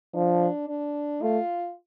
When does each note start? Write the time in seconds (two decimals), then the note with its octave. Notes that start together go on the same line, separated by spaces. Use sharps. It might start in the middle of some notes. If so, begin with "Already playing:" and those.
0.15 F3 D4
0.69 D4
1.22 A3 F4